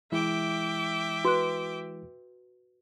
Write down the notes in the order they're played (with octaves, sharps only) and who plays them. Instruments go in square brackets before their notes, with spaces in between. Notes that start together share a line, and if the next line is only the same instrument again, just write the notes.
[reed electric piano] E3 G#3 E4 [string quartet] E5 G5 D6
[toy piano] F#4 [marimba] B4 F#6